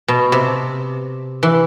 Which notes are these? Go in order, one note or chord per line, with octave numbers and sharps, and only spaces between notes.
B2
C3
E3